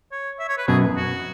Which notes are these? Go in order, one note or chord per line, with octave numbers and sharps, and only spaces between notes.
C#5
E5
C#5
B4
F#2 B2 G#4
F#4